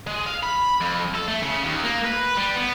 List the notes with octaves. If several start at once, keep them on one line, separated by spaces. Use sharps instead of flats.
G#3
F5
B5
F2
A4
A3
C#3
D#2
A#3
B4
G3
B3